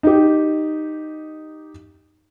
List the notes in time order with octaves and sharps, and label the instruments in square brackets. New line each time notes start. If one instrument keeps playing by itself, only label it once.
[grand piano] D#4 G4